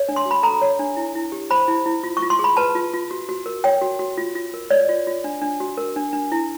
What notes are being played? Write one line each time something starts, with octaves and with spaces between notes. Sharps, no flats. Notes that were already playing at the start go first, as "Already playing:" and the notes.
Already playing: C#5
D4
C6
F#4
B5
A4 A#5
C#5
D4
E4
E4
G4
C5 B5
E4
E4
F4
C#6
F4
C6
G#4
B5
B4 A5
F4
F4
F#4
F#4
A#4
C#5 G5
F#4
F#4
F4
F4
A#4
C#5 D5
F4
F4
D4
D4
F#4
A#4
D4
D4
E4